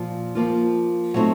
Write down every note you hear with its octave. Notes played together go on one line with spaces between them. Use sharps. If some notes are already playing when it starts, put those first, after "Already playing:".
Already playing: A#2 F3
F3 A#3 F4
F#3 A3 C4 D#4